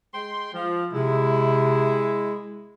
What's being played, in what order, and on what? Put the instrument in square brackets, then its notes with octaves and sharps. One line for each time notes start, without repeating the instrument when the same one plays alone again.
[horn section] G#3 G5 C6
F3
[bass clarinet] C3 [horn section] G#3 E4